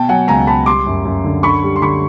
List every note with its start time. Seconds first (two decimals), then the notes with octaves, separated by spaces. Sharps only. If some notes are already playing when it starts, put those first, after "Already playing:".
Already playing: B2 G5 A5
0.09 F#3 F#5 G#5
0.28 C#2 G#5 A#5
0.47 C#2 A5 B5
0.66 G3 C6 D6
0.87 F#2
1.05 F#2
1.24 D3
1.43 D3 B5 C#6
1.63 G3
1.76 C6
1.82 D3 B5 C#6